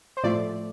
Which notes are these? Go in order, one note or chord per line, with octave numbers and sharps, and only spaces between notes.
C5
A2 F3 A3 D5